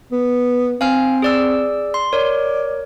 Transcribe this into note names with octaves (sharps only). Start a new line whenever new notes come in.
B3
C4 F5 G#5 F6
G#4 D5 E6
C6
A#4 C#5 D5